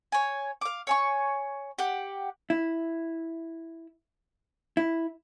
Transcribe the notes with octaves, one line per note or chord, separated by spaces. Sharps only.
C#5 G#5
F5 D6
C#5 G#5 C#6
G4 F#5
E4
E4